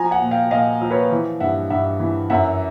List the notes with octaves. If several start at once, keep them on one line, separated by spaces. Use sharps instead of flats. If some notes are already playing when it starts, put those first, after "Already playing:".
Already playing: F3 G#5 A#5
F#5 G#5
A#2
F5 G5
A#2 D#5 F5
F3
B4 C#5
E3
G2 E5 F#5
G2 E5 F#5
E3
F#2 E5 F#5